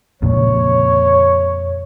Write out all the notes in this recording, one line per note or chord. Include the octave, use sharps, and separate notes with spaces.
F2 A#2 C#3 C#5